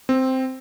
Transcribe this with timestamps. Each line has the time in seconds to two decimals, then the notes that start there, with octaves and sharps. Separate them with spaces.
0.09 C4